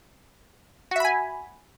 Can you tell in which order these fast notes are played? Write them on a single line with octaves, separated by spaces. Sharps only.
F#4 E5 B5 G#5